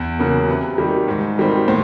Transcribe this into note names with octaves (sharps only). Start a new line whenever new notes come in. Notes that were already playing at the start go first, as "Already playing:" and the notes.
Already playing: E2
C#3 F#3 A#3
C3 B4
D#3 G3
G#2
D#3 G3 C4
A2 C5